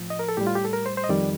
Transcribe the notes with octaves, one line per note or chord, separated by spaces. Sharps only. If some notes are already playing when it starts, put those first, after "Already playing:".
Already playing: A2 F3
D#5
A#4
A4
A2 G3 G4
F4
G4
A4
A#4
C5
C5
D#5
F2 D#3 G3 D5